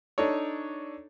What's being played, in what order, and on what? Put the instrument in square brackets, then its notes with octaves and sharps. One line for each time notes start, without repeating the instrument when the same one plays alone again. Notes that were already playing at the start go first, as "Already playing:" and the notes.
[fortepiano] D4 D#4 A4 C#5